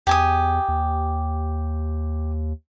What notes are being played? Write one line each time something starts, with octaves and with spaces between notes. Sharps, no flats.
E2 G4 G#5 D#6
D#2